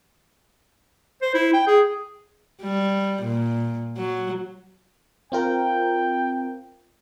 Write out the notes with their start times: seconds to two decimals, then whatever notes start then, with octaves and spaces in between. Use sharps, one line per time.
1.22 C5
1.34 E4
1.54 G5
1.67 G#4
2.62 G3
3.22 A#2
3.97 F#3
5.32 C4 F4 A#4 G5